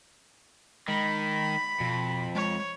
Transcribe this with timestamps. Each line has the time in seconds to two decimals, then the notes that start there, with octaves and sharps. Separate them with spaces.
0.88 D#3 G#3 B5
1.81 F2 B2
2.35 G#3 C#5